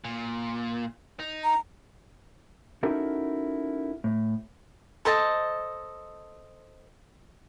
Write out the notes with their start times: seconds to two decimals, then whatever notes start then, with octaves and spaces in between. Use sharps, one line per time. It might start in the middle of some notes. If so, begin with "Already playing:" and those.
0.04 A#2
1.20 D#4
1.44 A#5
2.83 C#4 D#4 E4 F#4 A4 A#4
4.04 A2
5.05 A4 C5 D#5 A5